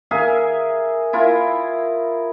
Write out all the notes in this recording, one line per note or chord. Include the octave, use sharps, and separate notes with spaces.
G#4 A#4 E5 F5
E4 F4 A#4